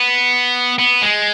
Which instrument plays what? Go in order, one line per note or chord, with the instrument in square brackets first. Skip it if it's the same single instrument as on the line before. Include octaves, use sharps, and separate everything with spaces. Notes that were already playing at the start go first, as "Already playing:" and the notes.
Already playing: [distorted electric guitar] B3
B3
G#3